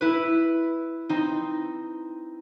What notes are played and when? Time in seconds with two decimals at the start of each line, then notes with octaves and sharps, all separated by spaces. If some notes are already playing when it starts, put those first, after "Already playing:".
0.01 E4 B4
1.09 C4 D#4